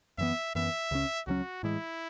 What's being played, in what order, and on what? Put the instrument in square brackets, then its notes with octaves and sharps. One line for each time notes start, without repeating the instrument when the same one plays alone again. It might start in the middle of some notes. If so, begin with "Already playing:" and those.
[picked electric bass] F#2 E3 B3 [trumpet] E5
[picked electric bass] F#2 E3 B3 [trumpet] E5
[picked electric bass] C#2 C#3 F#3 C#4
[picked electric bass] C#2 C#3 F#3 C#4 [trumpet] F#4
[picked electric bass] A2 E3 G#3 [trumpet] E4